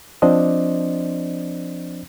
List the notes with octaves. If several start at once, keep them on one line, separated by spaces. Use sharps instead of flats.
F3 C4 D4 C5 D5 D#5